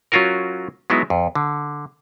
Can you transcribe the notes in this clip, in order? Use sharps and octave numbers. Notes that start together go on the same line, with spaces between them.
F#3 C#4 F4 F#4 A#4
F#3 G#3 B3 D#4 E4
F2
D3